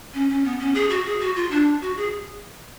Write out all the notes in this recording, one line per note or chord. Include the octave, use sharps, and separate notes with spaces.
C#4
C#4
B3
C#4
G#4
F#4
G#4
F#4
F4
D4
F#4
G#4